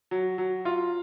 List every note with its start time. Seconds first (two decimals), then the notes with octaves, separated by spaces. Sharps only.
0.11 F#3
0.38 F#3
0.65 F4